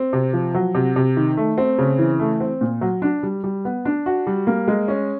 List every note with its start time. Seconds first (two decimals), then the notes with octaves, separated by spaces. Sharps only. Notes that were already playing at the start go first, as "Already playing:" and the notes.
Already playing: C4
0.13 C3
0.33 F3
0.54 F#3
0.75 C3
0.96 C3
1.17 D#3
1.37 A3
1.58 C4
1.78 C#3
1.98 E3
2.20 A3
2.40 C4
2.61 A#2
2.81 F#3
3.02 D4
3.23 G3
3.44 G3
3.65 B3
3.85 D4
4.06 F#4
4.27 G3
4.47 A#3
4.68 G#3
4.88 C#4